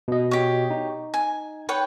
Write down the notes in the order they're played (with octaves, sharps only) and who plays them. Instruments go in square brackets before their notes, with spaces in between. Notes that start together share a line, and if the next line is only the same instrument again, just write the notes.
[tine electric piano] B2 D#5
[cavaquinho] G4 C#5
[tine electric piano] D#4
[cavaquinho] G#5
B4 C#5 G5